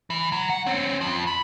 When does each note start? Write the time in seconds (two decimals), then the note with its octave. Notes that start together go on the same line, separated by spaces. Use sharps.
0.10 E3
0.32 F#3
0.50 F#5
0.66 C4 C#4
1.01 F2 F3
1.27 B5